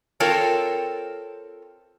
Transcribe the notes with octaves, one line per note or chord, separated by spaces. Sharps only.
C4 F4 A4 A#4 C#5